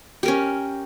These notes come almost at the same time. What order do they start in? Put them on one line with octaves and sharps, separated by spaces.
G4 A#4 C#4